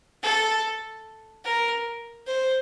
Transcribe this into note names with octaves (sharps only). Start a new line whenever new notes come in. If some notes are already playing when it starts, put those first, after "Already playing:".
A4
A#4
C5